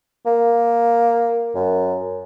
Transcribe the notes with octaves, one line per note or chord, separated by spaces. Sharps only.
A#3
F#2